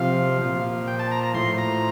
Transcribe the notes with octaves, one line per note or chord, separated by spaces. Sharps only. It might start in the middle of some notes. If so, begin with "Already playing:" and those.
Already playing: C3 F3 F5
A#2 F3
G5
A5
A#5
A#5
A2 F3 C6
A#5